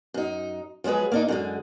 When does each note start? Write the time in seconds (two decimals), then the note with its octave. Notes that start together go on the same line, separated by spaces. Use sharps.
0.14 F#2 D#4
0.84 F3 F#3 G#3 G#4 B4
1.12 A#3 D4 D#4
1.28 F#2 D3 G#3